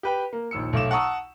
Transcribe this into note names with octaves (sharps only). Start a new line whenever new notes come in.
G4 B4 G5
A#3
A#1 D#2 E6 C#7
B1 A3 F5 D6 E7
F#5 A5 A#5 C#6 D#6 E6